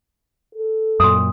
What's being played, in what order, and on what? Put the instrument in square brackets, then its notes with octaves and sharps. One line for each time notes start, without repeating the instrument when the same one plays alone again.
[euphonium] A4
[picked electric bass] F#2 A#2 [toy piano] C6 D#6